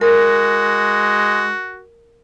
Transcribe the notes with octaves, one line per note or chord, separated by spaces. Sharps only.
G#3 F#4 A#4